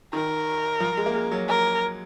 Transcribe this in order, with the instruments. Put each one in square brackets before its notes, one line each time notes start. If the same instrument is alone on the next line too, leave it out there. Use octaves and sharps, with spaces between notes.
[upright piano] D#3 [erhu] A#4
[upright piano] F3
G#3
A#3
G#3
F#3
[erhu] A#4